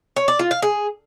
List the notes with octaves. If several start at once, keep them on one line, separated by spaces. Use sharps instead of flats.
C#5
D5
F4
F5
G#4